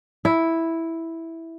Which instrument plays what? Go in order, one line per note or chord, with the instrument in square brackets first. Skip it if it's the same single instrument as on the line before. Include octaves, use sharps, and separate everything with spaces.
[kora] E4